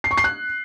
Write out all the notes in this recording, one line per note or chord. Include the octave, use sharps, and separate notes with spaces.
C7
C#6
C7
F#6